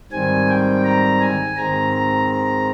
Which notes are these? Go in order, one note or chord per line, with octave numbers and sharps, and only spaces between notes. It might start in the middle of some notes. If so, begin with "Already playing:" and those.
G#2 D#3 G3 C4 G#5
G5
A#5
G#5
G#2 D#3 G#3 C4 A#5
A#5
A#5